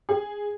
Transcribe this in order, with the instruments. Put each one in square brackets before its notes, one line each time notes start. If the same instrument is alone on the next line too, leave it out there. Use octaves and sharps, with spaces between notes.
[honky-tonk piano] G#4